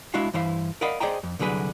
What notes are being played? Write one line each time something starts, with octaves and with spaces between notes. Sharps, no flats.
G#3 D4 E4 F#4 F5 F#5
G2 E3 E4 C5 F5
A#4 D5 D#5 F5 F#5 B5
G#4 C5 D5 D#5 G5 A#5
F2
C2 D3 F#3 G#4 B4